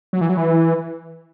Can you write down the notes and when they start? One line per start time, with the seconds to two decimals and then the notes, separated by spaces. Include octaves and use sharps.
0.13 F#3
0.21 E3
0.29 F#3
0.37 E3